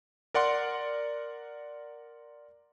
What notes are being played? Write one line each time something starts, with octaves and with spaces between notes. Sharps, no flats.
A#4 D5 F#5 C6